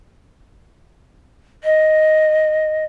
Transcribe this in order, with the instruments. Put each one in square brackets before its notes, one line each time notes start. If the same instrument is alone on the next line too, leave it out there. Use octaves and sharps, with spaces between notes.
[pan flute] D#5